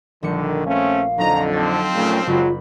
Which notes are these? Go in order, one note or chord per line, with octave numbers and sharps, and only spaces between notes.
A#1 D3 D#3 G3 C#7
A3 C4 C#4 F5
F2 D3 F#3 D#4 D#5 A#5
F3 C4 A5 A6
A#2 C#3 A3
F#1 F#3 G#3 F4 F#4 B5